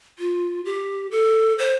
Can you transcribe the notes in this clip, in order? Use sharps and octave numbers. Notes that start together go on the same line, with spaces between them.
F4
G4
A4
C5